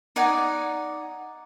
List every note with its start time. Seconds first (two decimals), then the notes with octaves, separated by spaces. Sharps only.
0.16 D#4 D5 F#5 G#5